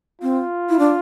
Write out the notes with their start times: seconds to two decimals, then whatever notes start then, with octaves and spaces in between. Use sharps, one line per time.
0.22 C4 F4
0.70 E4
0.79 D4